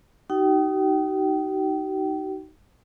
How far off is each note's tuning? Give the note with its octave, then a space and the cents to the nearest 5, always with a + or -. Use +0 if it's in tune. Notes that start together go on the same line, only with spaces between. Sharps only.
D#4 +0 F#4 +45 G5 -30